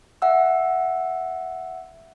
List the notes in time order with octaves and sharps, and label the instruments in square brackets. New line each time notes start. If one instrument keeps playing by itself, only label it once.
[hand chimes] E5 F#5 E6